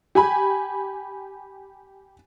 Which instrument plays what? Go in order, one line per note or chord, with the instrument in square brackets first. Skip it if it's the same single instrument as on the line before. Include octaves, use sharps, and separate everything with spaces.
[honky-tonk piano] G4 G#5 B5